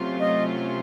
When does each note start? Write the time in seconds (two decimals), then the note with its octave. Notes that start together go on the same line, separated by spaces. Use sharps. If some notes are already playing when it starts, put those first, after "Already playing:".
Already playing: C3 F#3 A3 C#4 F4
0.20 D#5